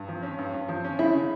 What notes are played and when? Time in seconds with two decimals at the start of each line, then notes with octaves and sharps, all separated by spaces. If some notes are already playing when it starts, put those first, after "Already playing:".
Already playing: G2
0.08 F3
0.23 C#4
0.38 G2
0.54 G2
0.69 F3
0.85 C#4
0.99 C#3 E4
1.15 C#3